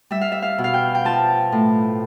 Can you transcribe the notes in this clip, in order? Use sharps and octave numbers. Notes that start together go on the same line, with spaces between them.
G3 E5
F5
E5
F5
B2
F5
G5
G5
F3 A5
A2